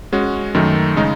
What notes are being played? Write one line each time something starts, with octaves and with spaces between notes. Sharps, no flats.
G#3 C#4 F#4
F#2 D#3 A3
C#3 G#3 D#4